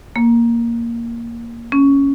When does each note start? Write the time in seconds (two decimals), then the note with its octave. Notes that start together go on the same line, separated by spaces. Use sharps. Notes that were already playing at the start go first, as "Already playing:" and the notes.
0.16 A#3
1.72 C#4